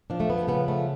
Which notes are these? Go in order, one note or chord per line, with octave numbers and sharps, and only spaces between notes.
F3 D4
A3
B3
C#3 B3
A3